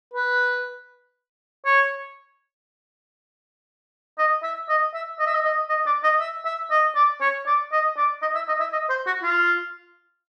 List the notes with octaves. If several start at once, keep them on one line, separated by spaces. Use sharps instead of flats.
B4
C#5
D#5
E5
D#5
E5
D#5
E5
D#5
D#5
D#5
D5
D#5
E5
E5
D#5
D5
C#5
D5
D#5
D5
D#5
E5
D#5
E5
D#5
C5
F#4
F4